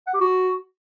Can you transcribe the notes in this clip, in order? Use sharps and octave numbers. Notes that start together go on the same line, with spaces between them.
F#5
G4
F#4